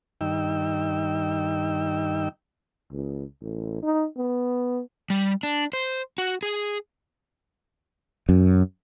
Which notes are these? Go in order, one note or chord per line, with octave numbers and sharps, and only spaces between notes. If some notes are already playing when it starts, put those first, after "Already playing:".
G2 D#3 D#4 G5 E6
C#2
A1
D#4
B3
G3
D4
C5
F#4
G#4
F#2